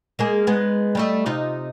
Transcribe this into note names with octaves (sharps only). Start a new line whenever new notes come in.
G#3 A#3 G#4
G#3 B3 D#4
G3 A3 D#5
C3 D#4 F4